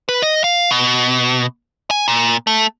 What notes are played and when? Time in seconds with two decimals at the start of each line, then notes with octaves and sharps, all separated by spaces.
0.09 B4
0.22 D#5
0.44 F5
0.71 B2
1.91 G#5
2.08 A#2
2.47 A3